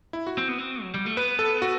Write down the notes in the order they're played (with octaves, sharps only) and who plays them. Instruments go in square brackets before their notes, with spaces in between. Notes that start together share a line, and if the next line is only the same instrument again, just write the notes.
[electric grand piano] E4
F#4
[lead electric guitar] C4
B3
C4
F#3
G3
A3
[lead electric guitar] B3 [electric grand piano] B4
[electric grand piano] A4
F#4